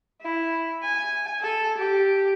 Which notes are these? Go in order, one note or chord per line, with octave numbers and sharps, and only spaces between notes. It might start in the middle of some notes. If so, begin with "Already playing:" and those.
E4
G#5
A4
G4